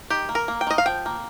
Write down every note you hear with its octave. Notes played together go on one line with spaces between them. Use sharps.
D#3 G4
A#3
A#4
A#3
G5
D#3 D#5
F5
F3 G5
A#3